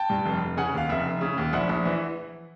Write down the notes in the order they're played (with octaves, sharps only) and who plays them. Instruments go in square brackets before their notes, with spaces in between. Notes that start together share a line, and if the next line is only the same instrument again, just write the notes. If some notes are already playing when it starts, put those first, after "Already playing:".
Already playing: [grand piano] G5 A5
G2
F1
F1
C#3 F#5 G#5
D#2 F5
F1 E5 F#5
F1
C#3
D#2
A#1 E5 F#5
A#1
E3